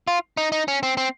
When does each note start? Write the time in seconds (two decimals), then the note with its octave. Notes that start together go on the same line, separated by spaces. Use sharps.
0.08 F4
0.37 D#4
0.52 D#4
0.68 C#4
0.83 C4
0.97 C4